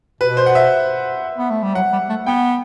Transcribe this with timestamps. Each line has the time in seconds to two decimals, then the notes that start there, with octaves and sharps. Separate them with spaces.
0.21 B2 B4
0.37 C5
0.46 F#5
0.55 E5
1.38 B3
1.50 A3
1.63 G3
1.75 F#3 F#5
1.93 G3
2.09 A3
2.26 B3 G5